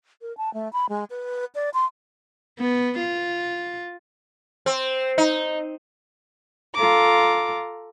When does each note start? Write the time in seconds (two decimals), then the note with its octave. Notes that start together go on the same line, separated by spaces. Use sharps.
0.22 A#4
0.37 A5
0.54 A3
0.73 B5
0.89 G#3
1.10 B4
1.55 D5
1.74 C6
2.59 B3
2.99 F4
4.66 C4
5.18 D#4
6.75 F4 A4 A#5 D6